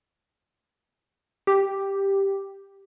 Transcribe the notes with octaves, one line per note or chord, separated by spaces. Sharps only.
G4